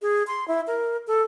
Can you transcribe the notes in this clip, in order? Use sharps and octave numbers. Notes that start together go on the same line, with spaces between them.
G#4
C6
E4
A#4
A4